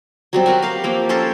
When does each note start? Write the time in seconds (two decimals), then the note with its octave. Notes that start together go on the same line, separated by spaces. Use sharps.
0.33 F#3 G3 C4
0.46 F#4 A#4 B4
0.62 G4 F5
0.84 F3 A#3 C4
1.09 C#4 A4 A#4 C5